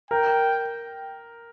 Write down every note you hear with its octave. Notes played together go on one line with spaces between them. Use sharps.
A#4 G5